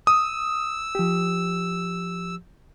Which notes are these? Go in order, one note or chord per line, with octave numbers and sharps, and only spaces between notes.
D#6 E6
F3 G4